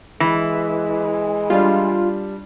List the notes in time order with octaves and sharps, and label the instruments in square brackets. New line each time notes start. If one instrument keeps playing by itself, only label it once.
[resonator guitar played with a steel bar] E3 [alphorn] G#3
[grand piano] G3 D4 [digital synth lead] F4